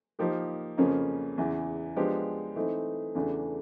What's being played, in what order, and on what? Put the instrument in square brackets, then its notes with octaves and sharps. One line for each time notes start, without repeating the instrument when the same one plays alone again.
[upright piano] F3 A#3 D#4 G4 A#4
F2 C#3 F3 A#3 C#4
E2 C#3 E3
F3 G#3 B3 D4 G4
E3 A3 C4 D#4
E2 C#3 E3 A3 D4